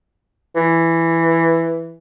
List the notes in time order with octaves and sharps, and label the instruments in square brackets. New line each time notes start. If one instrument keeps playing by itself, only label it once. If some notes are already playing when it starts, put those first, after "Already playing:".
[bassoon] E3